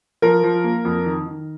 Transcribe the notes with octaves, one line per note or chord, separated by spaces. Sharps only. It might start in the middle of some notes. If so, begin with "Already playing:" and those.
F3 A#4
F3
A#3
F2
D#3
D#3